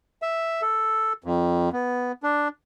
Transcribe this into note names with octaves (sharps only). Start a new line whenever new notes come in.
E5
A4
F2
B3
D4